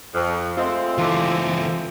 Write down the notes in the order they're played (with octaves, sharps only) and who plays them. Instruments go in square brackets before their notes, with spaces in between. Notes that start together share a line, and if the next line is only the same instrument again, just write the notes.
[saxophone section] F2
[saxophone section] G#3 A3 C4 [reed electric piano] F4 D#5
[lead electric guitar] C#2 E3 [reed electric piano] F4 A4 D6